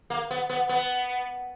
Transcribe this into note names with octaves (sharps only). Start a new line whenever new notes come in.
A#3
B3
B3
B3